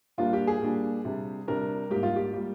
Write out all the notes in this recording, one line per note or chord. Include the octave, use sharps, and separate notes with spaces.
A#2 G3 A#3 D4 F4
G4
G#4
A#2 G3 A#3 D4
C3 G3 D4
C3 G3 D4 A#4
G#2 G3 A#3 G4
F4
G4
G3 A#3